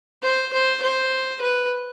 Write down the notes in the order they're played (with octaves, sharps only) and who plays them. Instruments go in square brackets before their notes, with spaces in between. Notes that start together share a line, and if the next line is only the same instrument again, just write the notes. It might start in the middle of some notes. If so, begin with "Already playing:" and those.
[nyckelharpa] C5
C5
C5
B4